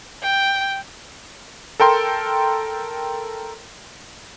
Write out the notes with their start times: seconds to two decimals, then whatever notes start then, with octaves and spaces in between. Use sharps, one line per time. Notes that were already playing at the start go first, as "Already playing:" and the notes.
0.22 G5
1.80 A4 A#4 G5 C6